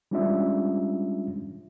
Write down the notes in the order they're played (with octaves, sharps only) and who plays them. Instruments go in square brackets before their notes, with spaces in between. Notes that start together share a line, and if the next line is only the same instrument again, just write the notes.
[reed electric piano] G3 G#3 C#4 D4 F4 E5